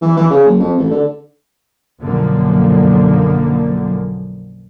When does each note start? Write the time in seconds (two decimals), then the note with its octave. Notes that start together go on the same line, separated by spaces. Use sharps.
0.01 E3
0.17 E3
0.30 C#3
0.46 F#1
0.59 F2
0.78 A1
0.91 D3
2.00 B1 F#2 D3 F3 A#3